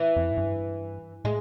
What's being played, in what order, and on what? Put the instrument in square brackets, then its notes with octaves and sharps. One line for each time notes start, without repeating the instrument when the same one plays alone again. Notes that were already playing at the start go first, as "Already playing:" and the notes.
Already playing: [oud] E3
[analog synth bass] F2
G#2
G2
[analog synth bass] A2 [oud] G#3